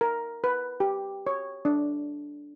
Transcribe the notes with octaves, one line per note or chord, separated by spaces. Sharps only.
A#4
B4
G4
C#5
D4